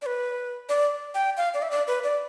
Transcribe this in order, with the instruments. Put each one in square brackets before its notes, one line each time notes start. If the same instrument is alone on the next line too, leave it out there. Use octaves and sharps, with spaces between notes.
[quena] D5
B4
D5
G5
F5
D5
E5
D5
B4
D5